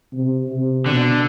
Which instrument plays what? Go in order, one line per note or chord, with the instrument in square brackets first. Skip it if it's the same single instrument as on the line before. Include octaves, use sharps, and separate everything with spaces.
[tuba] C3
C3
[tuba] B2 [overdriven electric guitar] D3